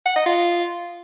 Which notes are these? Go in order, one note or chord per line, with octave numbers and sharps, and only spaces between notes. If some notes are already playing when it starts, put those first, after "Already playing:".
F#5
D#5
F4